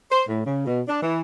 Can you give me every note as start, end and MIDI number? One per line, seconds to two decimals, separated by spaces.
0.11 0.24 72
0.28 0.41 45
0.46 0.65 49
0.67 0.81 47
0.88 0.99 62
1.03 1.20 52